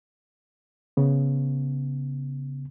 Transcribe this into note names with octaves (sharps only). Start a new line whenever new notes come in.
C#3 B3